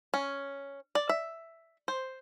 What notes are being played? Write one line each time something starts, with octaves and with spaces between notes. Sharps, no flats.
C#4
D5
E5
C5